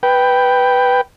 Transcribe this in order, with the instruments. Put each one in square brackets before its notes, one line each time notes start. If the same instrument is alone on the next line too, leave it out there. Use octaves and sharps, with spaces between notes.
[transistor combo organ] B4 G5